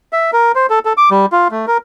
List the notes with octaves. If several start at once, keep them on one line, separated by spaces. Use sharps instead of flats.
E5
A#4
C5
A4
A4
D6
G3
F4
A3
A#4